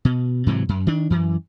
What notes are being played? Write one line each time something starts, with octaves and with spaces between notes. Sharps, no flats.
B2
G#2 C3 E3 F#3
F#2
D#3 D4
F#2 E3